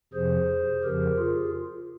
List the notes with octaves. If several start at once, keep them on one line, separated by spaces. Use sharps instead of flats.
F2 C3 F3 G#4 C5
F2 C#3 F3 G4 A#4
F4 G#4